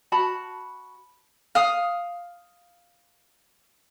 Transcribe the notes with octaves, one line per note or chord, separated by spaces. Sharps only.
F#4 A5 B5
F5 D#6